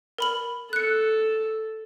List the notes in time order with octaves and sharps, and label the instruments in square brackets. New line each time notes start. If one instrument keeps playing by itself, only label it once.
[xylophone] A#4 B5 F#7
[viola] A4 [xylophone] F#6 C#7